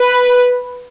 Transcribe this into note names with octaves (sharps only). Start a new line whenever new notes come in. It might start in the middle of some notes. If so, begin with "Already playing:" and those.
Already playing: B4